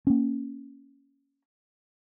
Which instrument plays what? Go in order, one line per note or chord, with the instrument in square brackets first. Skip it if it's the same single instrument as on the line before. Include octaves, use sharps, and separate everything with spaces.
[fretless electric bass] A#3 C#4